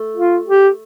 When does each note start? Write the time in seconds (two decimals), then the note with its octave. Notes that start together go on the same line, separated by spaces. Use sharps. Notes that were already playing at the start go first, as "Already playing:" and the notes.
Already playing: A3
0.16 F4
0.47 G4